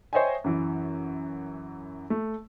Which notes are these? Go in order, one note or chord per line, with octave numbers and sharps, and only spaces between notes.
C5 C#5 D#5 E5 G5 G#5
F#2 E3
A3